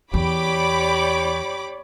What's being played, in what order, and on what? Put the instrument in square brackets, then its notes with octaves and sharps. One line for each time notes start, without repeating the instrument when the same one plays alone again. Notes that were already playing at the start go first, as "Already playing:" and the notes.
[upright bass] E2 [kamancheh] G4 [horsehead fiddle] C#5 D5 [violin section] B5 D6